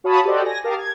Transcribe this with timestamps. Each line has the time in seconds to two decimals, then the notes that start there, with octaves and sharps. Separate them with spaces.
0.04 F#4 C#5 F5 A5 B5 D#6
0.24 F#4 G4 A4 C5 D5 D#5
0.44 G#5 A#6
0.64 G4 A#4 F5 A5 A#5 D#6
0.79 G#6